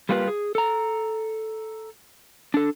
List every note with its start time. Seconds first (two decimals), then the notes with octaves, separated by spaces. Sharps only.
0.09 G3 A#3 F4 G4 B4
0.28 G#4
0.55 A4 A#5
2.54 D4 A4